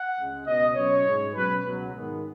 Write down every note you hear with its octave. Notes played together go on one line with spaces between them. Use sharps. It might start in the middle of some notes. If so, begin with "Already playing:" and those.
Already playing: F#5
C#2 C#3 G#3
C#2 B2 B3 D#5
B2 F#3 C#4 C#5
G#2 G#3 C#4
B2 F#3 C#4 B4
C#2 B2 F#3
G#2 D#3 G#3 B3